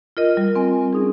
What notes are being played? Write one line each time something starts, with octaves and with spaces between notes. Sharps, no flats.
F4 A#4 D#5
G3
C4 G#5
C#4 D#4 G#4